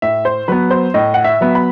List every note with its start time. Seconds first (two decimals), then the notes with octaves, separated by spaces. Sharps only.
0.02 A2 E5
0.25 C5
0.48 F#3 B3 B4
0.71 C5
0.94 A2 D#5
1.14 F#5
1.24 E5
1.41 F#3 B3
1.55 B5